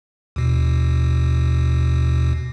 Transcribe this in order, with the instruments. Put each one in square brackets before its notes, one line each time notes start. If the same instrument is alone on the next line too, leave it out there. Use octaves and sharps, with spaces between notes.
[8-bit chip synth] D#2 B2